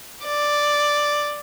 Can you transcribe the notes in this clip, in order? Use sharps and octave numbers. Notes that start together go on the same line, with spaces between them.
D5